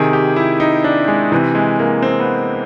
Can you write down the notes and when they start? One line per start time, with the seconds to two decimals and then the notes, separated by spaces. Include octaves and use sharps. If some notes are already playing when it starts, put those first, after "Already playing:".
Already playing: C3 D#3 G#4
0.13 G4
0.36 E4
0.60 D#4
0.84 D4
1.08 G#3
1.32 C3 E3
1.55 G#3
1.79 A#3
2.02 C4
2.20 B3